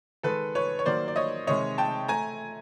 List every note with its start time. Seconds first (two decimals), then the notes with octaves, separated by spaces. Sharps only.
0.23 D#3 G#3 A4 B4
0.55 B4 C#5
0.79 C#5
0.86 D#3 F#3 A#3 C5 D5
1.08 D5
1.16 C#5 D#5
1.47 C3 D#3 G#3 C#5 D#5
1.78 G5 A5
2.08 A3 G#5 A#5